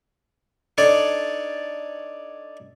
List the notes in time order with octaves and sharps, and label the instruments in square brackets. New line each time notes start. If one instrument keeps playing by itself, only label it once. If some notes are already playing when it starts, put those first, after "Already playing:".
[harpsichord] D4 D#4 A4 C#5 D5